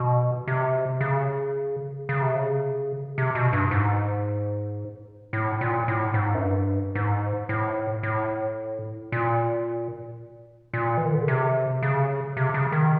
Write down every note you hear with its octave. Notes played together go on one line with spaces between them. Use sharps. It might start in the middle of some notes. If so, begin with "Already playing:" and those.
Already playing: B2
C3
C#3
C#3
C3
C#3
C3
B2
G2
G#2
A2
A#2
A2
G#2
F#2
G2
G#2
A2
A2
A#2
A#2
E3
D#3
D3
C#3
C3
C#3
C3
C#3
D#3